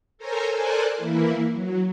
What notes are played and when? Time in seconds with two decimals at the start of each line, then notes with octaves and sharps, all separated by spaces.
0.18 A4 A#4 C5 C#5 G#5 A#5
0.51 A4 A#4 C5 D5 G#5 F#6
0.96 E3 A#3 E4
1.52 F#3